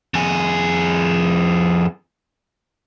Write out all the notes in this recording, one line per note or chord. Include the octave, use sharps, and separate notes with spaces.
F2 G#4